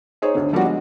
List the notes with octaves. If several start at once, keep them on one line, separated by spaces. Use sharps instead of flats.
D#4 G#4 C5 C#5
D2 D3
F3 G3 A#3 D4 F#4
G#3